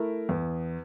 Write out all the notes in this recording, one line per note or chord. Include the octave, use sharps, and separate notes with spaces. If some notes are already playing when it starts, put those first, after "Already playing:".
Already playing: A3 E4 A#4
E2